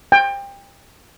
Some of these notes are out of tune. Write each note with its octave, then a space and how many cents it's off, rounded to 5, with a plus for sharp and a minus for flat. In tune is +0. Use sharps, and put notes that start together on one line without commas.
G5 +25